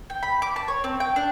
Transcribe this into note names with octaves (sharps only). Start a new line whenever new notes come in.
G5
B5
D6
A5
C#5
C4
G5
D4